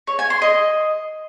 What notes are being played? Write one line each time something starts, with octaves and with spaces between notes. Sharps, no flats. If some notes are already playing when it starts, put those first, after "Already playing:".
C#5
G#5
C6
D#5